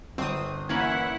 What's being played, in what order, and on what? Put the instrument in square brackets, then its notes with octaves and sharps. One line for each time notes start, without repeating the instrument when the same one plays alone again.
[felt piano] G1 [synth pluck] C4 D#6
[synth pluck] E3 A#3 C#4 [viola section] E4 F#5 [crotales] G#6 F#7